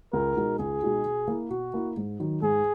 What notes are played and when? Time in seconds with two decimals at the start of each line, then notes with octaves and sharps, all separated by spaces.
0.13 C#2 A#4
0.36 B2 G#3 D#4 F#4
0.59 C#2 G#4
0.82 B2 G#3 D#4 F#4
1.05 B2
1.28 A#3 E4
1.50 B2 F#4
1.74 A#3 E4
1.97 G#2
2.20 D#3 F#3
2.42 G#2 G#4